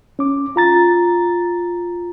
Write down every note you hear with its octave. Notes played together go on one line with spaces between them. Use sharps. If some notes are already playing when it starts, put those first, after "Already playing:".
C#4 D6
F4 A#5 A6